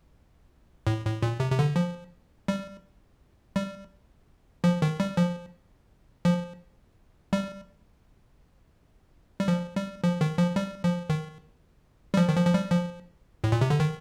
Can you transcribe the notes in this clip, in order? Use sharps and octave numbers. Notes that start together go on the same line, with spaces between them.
A2
A2
A#2
C3
C3
D3
F3
G3
G3
F3
D#3
G3
F3
F3
G3
G3
F3
G3
F3
D#3
F3
G3
F3
D#3
G3
F3
D#3
F3
F3
G3
F3
A2
A#2
C3
D3
D#3